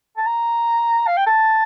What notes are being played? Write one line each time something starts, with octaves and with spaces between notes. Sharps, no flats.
A5
A#5
F5
G5
A5